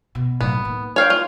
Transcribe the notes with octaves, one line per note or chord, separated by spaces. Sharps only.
B2
A2 F#3 B3
D#3 A#3
C#5 F5 G5
F4